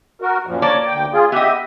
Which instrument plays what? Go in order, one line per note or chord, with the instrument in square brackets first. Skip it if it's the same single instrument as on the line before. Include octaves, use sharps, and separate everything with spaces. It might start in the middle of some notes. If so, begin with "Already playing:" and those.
[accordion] F#4 A#4
F#2 A#2 F3
[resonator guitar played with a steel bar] A#3 D5 [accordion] C#5 A5
[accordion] D2 G5
F4 G#4
[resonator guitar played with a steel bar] B3 D#5 [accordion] G4 E5